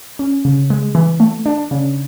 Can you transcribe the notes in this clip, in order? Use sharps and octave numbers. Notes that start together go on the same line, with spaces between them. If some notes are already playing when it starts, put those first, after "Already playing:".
C#4
C#3
G#3
E3
A3
D4
C#3